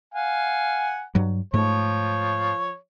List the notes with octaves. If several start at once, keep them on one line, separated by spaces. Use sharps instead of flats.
F5 F#5 G#5
G2 F#3
G#2 F3 A3 C#5